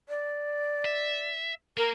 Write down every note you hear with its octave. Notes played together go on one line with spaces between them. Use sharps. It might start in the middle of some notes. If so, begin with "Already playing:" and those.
D5
E5
A#3 A#4